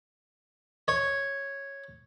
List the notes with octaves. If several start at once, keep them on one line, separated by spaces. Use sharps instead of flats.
C#5